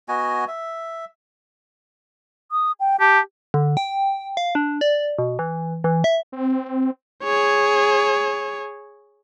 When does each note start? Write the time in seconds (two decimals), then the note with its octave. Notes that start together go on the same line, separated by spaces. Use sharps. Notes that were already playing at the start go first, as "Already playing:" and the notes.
0.08 B3 F#4 D#5 G#5
0.48 E5
2.52 D#6
2.80 G5
3.00 G4 A5
3.54 D3
3.77 G5
4.37 F5
4.55 D4
4.81 D5
5.18 B2
5.39 E3
5.84 E3
6.04 E5
6.32 C4
7.24 G#4 C#5